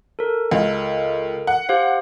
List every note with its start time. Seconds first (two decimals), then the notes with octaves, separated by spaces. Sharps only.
0.19 A4 A#4
0.51 C#2
1.47 F#5
1.69 G4 C5 F5